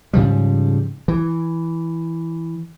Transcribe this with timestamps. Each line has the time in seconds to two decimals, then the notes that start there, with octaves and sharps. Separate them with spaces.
0.13 G#2 C#3 F3 G3
1.08 E3